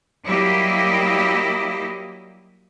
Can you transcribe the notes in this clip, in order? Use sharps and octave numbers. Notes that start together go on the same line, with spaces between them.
F#3 G3 A#3 E4 G4 D#5